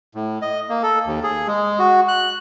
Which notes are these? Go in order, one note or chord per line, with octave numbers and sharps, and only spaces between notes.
A2
D#5
A#3
A4
D#2
G#4
G#3
F#4
F#6